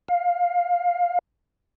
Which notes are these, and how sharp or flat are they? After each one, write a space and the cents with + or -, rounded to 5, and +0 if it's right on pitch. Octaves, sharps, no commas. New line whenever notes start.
F5 +15